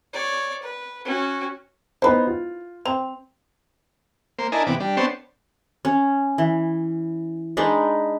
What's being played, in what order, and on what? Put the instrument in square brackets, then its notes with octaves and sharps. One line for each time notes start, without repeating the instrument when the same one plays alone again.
[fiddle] C#5 D5
B4
C#4 F#4
[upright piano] B3 D#4 C5 [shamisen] E4 B4
[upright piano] F4
[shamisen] C4 [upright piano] F7
[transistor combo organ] A#3 C5
D4 E4 A#4 D#5 G#5 A5
C3 E3 B3 D6
G3 D4
B3 C4 D4 C5 C#5 A5
[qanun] C#4
E3
G#3 D4 D#4 B4